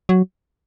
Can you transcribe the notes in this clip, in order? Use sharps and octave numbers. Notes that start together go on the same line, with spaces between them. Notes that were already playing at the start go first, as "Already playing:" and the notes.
F#3